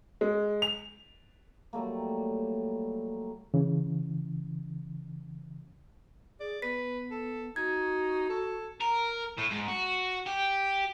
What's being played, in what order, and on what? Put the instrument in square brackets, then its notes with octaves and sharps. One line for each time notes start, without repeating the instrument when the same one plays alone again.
[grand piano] G#3
F7
[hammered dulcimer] F#3 G3 A3 A#3
[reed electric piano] C#3 E3
[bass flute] G#4 [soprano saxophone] D5
[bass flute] B3 [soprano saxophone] B4 [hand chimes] B6
[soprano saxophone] A4
[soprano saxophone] D#4 [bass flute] F#4 [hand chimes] G#6
[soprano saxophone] A4
[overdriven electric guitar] A#4
A2
G#2
F#4
G4